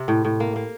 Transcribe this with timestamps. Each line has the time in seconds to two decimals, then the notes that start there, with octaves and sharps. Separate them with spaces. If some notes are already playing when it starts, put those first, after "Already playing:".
Already playing: C3
0.08 A2
0.25 A2
0.40 A#3
0.56 A#3